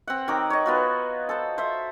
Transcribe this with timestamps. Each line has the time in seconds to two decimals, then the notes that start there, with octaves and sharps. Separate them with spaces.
0.08 C4 F#5
0.28 D#3 A#4 C#5 D6
0.50 C#5 D#5
0.66 B3 F4 F#4
1.29 A4 C5
1.58 C5 E5